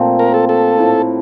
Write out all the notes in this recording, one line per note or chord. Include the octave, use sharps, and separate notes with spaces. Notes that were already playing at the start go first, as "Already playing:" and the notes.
Already playing: A#2 F3 A3 C4
A#4
A4
A4
A2 F3 A3 E4